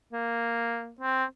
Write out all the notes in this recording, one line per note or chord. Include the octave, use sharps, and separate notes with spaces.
A#3
C4